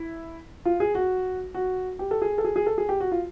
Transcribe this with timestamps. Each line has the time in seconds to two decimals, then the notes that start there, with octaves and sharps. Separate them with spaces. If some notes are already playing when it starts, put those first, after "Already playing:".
Already playing: E4
0.65 F4
0.80 G#4
0.95 F#4
1.54 F#4
1.99 G4
2.11 A4
2.22 G#4
2.38 A4
2.44 G#4
2.56 G#4
2.66 A4
2.78 G#4
2.89 G4
3.00 F#4
3.12 F4